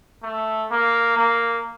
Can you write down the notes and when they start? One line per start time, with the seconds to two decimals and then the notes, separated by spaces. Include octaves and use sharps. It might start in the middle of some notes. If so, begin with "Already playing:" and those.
0.23 A3
0.71 A#3
1.17 A#3